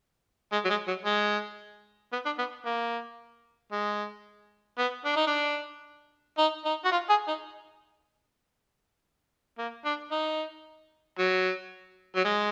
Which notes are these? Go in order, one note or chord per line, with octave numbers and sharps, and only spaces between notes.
G#3
F#3
G#3
F#3
G#3
B3
D4
B3
A#3
G#3
B3
D4
D#4
D4
D#4
D#4
F#4
F4
G#4
D#4
A#3
D4
D#4
F#3
F#3
G#3